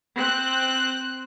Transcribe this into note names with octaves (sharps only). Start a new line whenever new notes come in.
C4 F#6